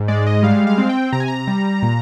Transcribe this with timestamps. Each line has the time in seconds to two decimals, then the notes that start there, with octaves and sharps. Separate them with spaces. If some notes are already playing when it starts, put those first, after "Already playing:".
Already playing: G#2
0.08 G#3 D5
0.27 D#5
0.43 G3 F5
0.67 F5
0.78 C4
0.89 G5
1.13 C3 A#5
1.20 G#5
1.28 A#5
1.47 G3
1.82 A#2